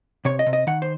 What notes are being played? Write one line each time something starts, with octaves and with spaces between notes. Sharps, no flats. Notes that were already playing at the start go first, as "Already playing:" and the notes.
C3 C#5
D#5
C3
D#5
D#3 F#5
C5